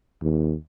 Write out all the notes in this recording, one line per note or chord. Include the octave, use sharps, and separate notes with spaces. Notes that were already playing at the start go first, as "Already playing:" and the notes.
D#2